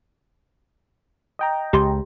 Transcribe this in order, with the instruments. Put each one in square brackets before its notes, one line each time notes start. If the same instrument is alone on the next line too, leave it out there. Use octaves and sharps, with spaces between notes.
[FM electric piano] D#5 G5 A#5
[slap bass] C#2 [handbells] G4 C6